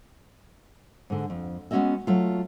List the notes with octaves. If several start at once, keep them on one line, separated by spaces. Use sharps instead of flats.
G#2 D3
F2
G#3 B3 C#4 F#4 D#5 E5
F#3 A3 F4